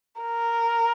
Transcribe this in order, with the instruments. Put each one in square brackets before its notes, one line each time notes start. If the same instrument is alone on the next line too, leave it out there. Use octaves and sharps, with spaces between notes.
[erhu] A#4